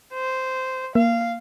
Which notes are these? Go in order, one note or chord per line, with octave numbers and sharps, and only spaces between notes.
C5
A#3 F5